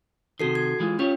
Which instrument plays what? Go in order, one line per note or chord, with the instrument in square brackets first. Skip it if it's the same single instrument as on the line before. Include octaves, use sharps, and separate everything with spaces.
[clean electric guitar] C3 D#3 [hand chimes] F#4 A4 C7
[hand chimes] G#6
[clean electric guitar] E3 G#3 F4
[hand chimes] C#4 [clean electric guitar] F4 G4 C#5